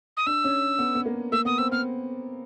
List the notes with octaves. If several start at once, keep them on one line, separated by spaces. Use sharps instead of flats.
D#6
D4 E6
C#4
B3
B3
A#3
A#3 E6
B3 D#6
C4 E6
B3 F6